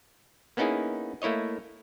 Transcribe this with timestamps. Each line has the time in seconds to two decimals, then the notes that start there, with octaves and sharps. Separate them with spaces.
0.57 A#3 B3 C#4 D#4 E4 G#4
1.22 A3 A#3 E4 C#5 D#5